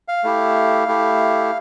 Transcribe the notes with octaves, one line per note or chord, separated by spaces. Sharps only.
F5
A3 E4 G4
A3 E4 G4